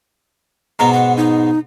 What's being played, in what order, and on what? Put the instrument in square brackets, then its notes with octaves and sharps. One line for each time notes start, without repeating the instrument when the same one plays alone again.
[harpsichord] G#2 B2 B3 [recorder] A#5
[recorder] F#5
D#4